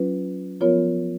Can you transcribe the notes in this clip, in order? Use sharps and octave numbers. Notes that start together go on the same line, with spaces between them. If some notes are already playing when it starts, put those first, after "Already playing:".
Already playing: F#3 C#4 F4 B4
F3 B3 F4 A#4 C#5